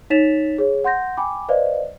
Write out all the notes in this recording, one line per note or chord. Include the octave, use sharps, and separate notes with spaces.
D#4 C#5 A6 B6 E7 F7
G#4 C#5
F#5 C6 G6 A#6
G5 G#5 B5 D6
B4 C5 D5 D#5 F5